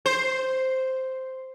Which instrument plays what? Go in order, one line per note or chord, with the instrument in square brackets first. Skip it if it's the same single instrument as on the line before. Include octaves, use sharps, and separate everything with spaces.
[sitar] C5